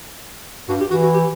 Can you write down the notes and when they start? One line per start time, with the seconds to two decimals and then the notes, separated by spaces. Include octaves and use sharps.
0.69 G2 F#4
0.80 G4
0.91 E3 F#4
1.03 F#4
1.14 G4